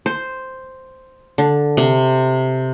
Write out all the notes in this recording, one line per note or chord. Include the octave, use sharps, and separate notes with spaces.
C5
D3
C3